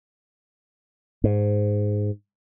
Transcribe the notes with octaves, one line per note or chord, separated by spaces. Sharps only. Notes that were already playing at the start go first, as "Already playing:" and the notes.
G#2